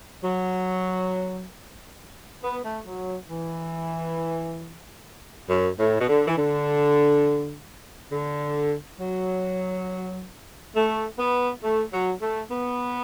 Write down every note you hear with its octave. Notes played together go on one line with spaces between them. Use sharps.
F#3
B3
A3
F#3
E3
F#2
A2
B2
D3
E3
D3
D3
F#3
A3
B3
A3
F#3
A3
B3